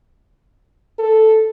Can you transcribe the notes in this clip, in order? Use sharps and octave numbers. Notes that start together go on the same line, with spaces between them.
A4